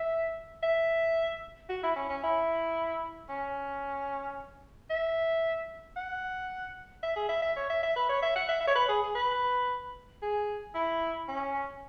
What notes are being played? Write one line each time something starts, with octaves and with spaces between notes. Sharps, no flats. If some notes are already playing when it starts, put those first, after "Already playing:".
Already playing: E5
E5
F#4
E4
C#4
C#4
E4
C#4
E5
F#5
E5
G#4
E5
E5
C#5
E5
E5
B4
C#5
E5
F#5
E5
E5
C#5
B4
G#4
G#4
B4
G#4
E4
C#4